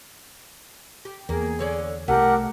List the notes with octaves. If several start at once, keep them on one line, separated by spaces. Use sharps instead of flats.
G4
E2 A#3 G#4
D3 C#5 D5
C2 A3 G4 A#4 F#5 D6